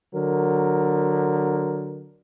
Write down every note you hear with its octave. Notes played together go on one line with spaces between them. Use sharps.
D3 F#3 A#4